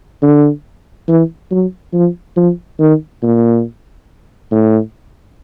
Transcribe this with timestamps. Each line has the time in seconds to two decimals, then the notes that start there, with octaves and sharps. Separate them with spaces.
0.22 D3
1.08 E3
1.51 F#3
1.93 F3
2.37 F3
2.80 D#3
3.23 A#2
4.52 A2